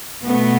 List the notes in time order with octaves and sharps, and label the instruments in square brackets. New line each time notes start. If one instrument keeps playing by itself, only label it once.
[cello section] B2 A3 B3